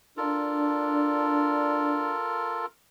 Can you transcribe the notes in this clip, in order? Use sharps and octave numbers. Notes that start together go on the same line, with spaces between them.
D4 F4 A4 A#4